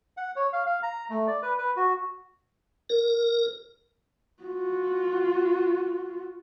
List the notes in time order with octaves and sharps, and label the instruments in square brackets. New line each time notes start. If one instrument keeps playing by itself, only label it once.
[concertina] F#5
C#5
F5
F5
A#5
A3
D5
B4
B4
F#4
[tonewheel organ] A#4
[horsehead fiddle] F4 F#4